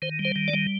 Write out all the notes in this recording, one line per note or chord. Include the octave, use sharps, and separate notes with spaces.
D#3 C5
G3
C5
D#3
D5
G3